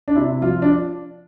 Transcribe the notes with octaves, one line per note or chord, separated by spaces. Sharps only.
D4
C3 E4
F3 F4
D4